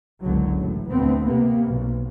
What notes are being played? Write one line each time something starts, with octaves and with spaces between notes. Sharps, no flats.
F#1 C#2 D3 F#3
A1 A2
D2 B3 C4
C3 A#3 B3
B1